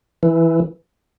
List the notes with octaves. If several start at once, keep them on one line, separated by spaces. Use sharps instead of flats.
E3